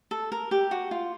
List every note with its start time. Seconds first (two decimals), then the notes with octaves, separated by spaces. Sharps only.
0.11 A4
0.32 A#4
0.51 G4
0.71 F#4
0.91 F4